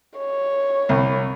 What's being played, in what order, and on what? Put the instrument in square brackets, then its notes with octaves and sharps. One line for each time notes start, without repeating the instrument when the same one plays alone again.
[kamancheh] C#5
[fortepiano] C2